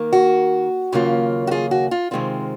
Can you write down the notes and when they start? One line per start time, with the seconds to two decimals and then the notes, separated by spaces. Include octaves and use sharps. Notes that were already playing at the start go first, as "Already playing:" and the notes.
Already playing: D#3 A#3
0.13 F#4
0.92 D#2 C#3 F#3 A#3 F4
1.47 F#4
1.51 F4 G#4
1.71 F#4
1.91 F4
2.11 C3 D#3 G#3 C4 F4